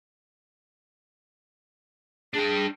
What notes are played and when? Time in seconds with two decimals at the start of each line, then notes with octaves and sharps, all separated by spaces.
2.34 D4 G#4 G5